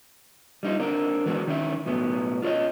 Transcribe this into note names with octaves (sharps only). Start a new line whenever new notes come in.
G3 D#4 F4
C4 D4 A#4
E3 G#3 B3 C4 F#4
D#3 C#4 E4
B1 A2 F#3 B3
F4 A4 C5 C#5 D#5